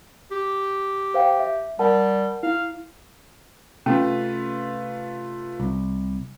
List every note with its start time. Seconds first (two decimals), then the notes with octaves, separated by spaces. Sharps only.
0.31 G4
1.14 C5 F5 G5
1.40 E5
1.79 G3 A#4 F#5 A5
2.43 E4 F5
3.86 C3 A3 C#4 F4 B4
5.60 C2